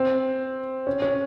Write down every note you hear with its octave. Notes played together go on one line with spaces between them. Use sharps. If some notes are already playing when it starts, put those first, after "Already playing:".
Already playing: C4
C#4
C#4